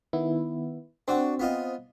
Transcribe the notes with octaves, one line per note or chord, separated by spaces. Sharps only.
D#3 B3 E4
C4 D4 F#4
B3 F4 D#5